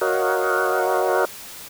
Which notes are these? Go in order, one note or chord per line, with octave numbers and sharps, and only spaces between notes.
F#4 A#4 C#5 D#5 F5 F#5